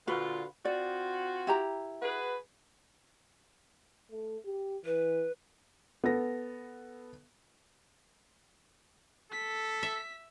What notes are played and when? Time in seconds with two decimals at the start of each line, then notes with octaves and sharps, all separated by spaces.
0.08 A#2 D3 F4 F#4 B4
0.65 C4 F4 F#4 D5
1.47 E4 G4 A#5
2.02 F#4 G#4 B4
4.11 A3
4.45 G4
4.85 E3 B4
6.04 B3 A4 A#6
9.32 A4 B6
9.83 E5